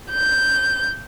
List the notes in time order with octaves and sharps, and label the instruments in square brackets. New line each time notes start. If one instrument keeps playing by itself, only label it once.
[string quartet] G6